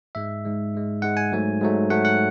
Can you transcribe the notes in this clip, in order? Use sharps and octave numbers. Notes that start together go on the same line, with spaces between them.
G#2 G#3 E5
G#2 G#3
G#2 G#3
G#2 G#3 F#5
G#5
G#2 F#3 A3
G#2 F#3 A3
G#2 F#3 A3 F#5
F#5